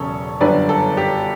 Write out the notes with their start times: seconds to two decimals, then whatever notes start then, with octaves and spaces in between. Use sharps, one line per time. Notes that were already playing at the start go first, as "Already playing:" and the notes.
Already playing: E1 E2 C#3 F#3 C#4 A4 C#5
0.41 G1 F#2 D3 G3 D4 B4 D5
0.69 A4
0.97 G4